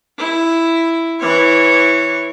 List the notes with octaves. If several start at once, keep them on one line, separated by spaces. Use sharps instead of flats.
E4
E3 C#5